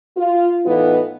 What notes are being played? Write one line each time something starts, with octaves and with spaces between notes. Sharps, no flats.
F4
A2 E3 B3 D#4 F4